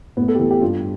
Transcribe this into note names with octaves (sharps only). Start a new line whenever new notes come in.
A2 B3
A4
G4
E3 A4
G4
G2 F4